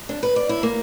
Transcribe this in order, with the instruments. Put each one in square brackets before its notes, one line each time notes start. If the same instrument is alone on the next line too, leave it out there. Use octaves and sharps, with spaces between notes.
[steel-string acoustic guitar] D4
B4
D5
E4
A#3